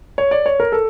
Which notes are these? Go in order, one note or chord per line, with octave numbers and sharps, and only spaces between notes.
C#5
D5
C#5
A#4
A4